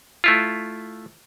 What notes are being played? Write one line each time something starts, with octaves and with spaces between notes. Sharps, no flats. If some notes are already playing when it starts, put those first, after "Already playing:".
A3 E4 F4